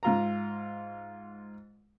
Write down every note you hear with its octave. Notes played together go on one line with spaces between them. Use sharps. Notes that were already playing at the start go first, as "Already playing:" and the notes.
G#2 F4 A#5